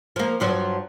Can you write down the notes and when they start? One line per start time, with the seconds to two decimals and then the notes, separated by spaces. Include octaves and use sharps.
0.16 F3 A#3
0.40 G2 F3 F#3